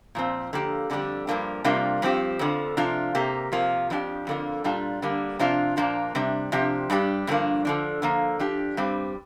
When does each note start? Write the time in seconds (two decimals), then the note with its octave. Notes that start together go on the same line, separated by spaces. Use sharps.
0.15 A#2 F3 C4
0.53 D3 F3 A#3 G4
0.90 F2 D3 G3 D4 G4
1.27 G2 F3 A#3 D4
1.64 C3 G3 A#3 D4 F4
2.02 G2 F3 C4 G4
2.39 F2 D3 F3
2.77 C3 F3 D4 F4
3.15 C3 A#3 G4
3.52 C3 F3 A#3 F4
3.90 F2 F3 D4 G4
4.27 F2 D3 A#3 F4
4.64 A#2 G3 D4 F4
5.02 D3 G3 A#3 D4
5.39 C3 F3 D4 F4
5.77 A#2 F3 A#3 D4
6.15 C3 G3 D4
6.52 C3 F3 D4 G4
6.90 G2 G3 D4 G4
7.27 G2 D3 F3 A#3 D4
7.65 D3 F3 D4
8.02 D3 F3 A#3
8.40 F3 D4 G4
8.77 G2 G3 C4